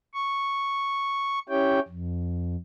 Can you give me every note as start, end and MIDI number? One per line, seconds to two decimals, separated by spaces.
0.14 1.39 85
1.49 1.80 61
1.49 1.80 64
1.49 1.80 67
1.49 1.80 73
1.49 1.80 79
1.88 2.56 41